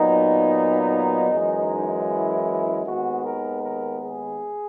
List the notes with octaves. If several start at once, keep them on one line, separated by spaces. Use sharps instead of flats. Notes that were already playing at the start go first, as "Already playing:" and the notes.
Already playing: A#2 F#3 B3 D#4
F#2 E3 G#3
E4
D#2 D#3 G#3 B3 F#4
A#4
A#4
G#4